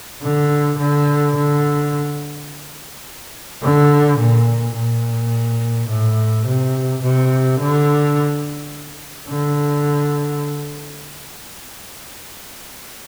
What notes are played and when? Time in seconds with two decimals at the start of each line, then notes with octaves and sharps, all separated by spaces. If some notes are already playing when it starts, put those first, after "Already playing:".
0.22 D3
0.78 D3
1.36 D3
3.63 D3
4.19 A#2
4.75 A#2
5.90 A2
6.46 C3
7.02 C3
7.60 D3
9.29 D3